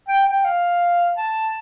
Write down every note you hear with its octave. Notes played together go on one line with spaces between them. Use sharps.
G5
G5
F5
A5